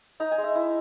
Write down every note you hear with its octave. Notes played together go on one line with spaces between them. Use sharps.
D#4 A#5
G#5
G#3
E5
E4